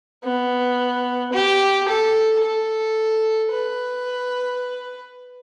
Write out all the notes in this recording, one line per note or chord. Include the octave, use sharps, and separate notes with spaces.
B3
G4
A4
A4
B4